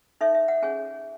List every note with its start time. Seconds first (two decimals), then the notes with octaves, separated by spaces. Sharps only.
0.21 D#4 A4 C#5 E5
0.35 E5
0.48 F#5
0.62 C#4 G#4 C#5 G#5